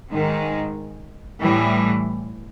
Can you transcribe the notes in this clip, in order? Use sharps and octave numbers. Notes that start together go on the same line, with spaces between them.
G#2 D#3 G#3
A2 E3 G3